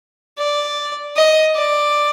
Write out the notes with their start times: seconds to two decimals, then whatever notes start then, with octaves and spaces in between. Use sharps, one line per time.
0.38 D5
1.16 D#5
1.55 D5